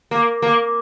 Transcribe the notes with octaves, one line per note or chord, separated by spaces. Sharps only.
A#3
A#3